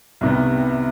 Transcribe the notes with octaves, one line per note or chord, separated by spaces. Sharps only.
C2 C3 D#3 G3 B3